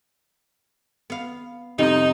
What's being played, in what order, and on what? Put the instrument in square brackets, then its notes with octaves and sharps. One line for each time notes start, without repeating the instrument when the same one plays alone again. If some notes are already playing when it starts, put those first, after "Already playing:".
[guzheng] B3 F5
[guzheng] F2 C3 G3 [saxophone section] D#4